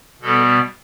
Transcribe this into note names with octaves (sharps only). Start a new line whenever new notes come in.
B2 G3 B3 A4